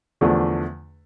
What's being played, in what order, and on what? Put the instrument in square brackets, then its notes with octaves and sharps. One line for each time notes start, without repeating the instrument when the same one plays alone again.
[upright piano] E2 D3 F3 A3 D4